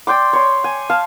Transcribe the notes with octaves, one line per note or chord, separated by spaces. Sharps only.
D5 G5 C6 D6
C#5 C6
G#5
F5 A5